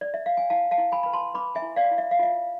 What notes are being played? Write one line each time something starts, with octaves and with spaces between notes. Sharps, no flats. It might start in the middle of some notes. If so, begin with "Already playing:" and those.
D5
E5
F5
G#5
E4 F5 A5
F5 A5
E4
G#5 B5
B4 B5
A5 C6
B4 B5 D6
E5 G#5
E4
D5 F5
E4
E5
F5
F4 E5